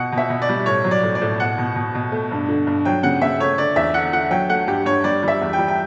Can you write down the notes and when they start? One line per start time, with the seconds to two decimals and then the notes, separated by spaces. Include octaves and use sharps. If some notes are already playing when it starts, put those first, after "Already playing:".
Already playing: B2 F#5
0.12 B2
0.17 E5
0.29 B2
0.42 D5
0.49 G3
0.66 A2 C#5
0.84 F#3
0.91 D5
1.04 A2
1.15 D5
1.22 A2
1.40 B2 F#5
1.58 B2
1.76 B2
1.95 B2
2.12 A3
2.31 G2
2.48 D3
2.67 G2
2.85 F#3 G5
3.03 C#3 F#5
3.21 C#3 E5
3.40 A3 C#5
3.58 D3 D5
3.76 E2 E5
3.94 D3 F#5
4.13 D3 F#5
4.30 F#3 G5
4.49 A3 F#5
4.67 G2 G4
4.85 G2 C#5
5.04 G3 D5
5.23 G3 E5
5.41 E2
5.53 G3 G5
5.68 G5